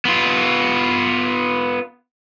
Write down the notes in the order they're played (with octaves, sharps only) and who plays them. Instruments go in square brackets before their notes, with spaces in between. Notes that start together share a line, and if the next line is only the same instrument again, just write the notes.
[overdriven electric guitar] B3 F4